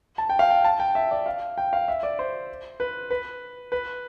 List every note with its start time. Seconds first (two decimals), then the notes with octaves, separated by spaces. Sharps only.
0.18 A5
0.29 G5
0.39 F5
0.50 G5
0.65 A5
0.80 G5
0.95 E5
1.11 D5
1.26 F5
1.58 G5
1.73 F5
1.88 E5
2.03 D5
2.19 C5
2.80 B4
3.10 B4
3.72 B4